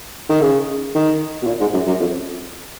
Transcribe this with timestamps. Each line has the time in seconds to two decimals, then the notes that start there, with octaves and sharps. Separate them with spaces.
0.30 D#3
0.41 C#3
0.95 D#3
1.42 B2
1.47 A#2
1.60 G#2
1.73 F#2
1.87 F#2
2.00 F2